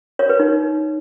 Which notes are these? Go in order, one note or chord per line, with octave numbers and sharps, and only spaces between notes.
C#5
B4
D#4